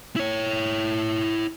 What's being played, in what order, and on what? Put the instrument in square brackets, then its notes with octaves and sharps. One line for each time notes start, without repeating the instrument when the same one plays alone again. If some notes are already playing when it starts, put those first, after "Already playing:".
[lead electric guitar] E4 C#5